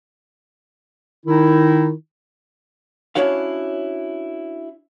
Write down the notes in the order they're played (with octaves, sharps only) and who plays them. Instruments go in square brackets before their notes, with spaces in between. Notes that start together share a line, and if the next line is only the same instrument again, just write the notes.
[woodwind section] D#3 D#4 E4
[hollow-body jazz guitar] C#4 D4 E4 F#4 C#5 F5